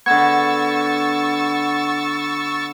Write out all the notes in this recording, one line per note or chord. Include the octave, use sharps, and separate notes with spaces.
D3 B3 F#5 C#6 E6 G#6 A6